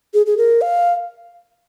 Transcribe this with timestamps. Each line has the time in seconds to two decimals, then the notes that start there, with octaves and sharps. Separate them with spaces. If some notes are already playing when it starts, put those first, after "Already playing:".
0.14 G#4
0.26 G#4
0.37 A#4
0.61 F5